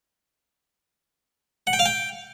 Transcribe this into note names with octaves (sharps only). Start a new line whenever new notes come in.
F#5
G5
F5
G5